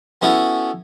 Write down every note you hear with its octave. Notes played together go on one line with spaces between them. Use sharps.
B3 C#4 E4 F#4 A4 C#5